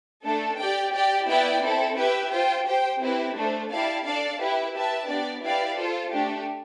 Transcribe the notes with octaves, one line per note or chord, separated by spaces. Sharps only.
A3 D4 A4
G4 D5 G5
G4 D5 G5
B3 E4 B4 D5 G5
C4 E4 A4
E4 G4 B4 E5 G5
F4 C5 G5
G4 C5 G5
C4 E4 G4 B4
A3 D4 A4 C5
E4 G4 D5 F5 A5
D4 A4 D5 F5 A5
E4 G4 B4
G4 B4 E5 A5
B3 D4 G4 D5
E4 G4 B4 D5 F5
F4 A4 C5
A3 D4 G4